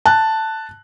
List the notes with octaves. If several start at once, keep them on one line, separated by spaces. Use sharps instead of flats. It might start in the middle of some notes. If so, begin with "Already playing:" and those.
A5 F#6